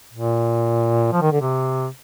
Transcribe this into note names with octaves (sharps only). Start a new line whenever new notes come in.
A#2
F3
D#3
D3
C3